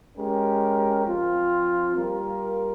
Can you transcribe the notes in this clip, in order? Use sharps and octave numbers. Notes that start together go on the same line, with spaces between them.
G#3 C#4 G4 A#4
F3 C4 F4
G3 A#3 F4 A#4